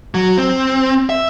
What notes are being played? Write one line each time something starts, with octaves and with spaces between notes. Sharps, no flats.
F#3
C4
E5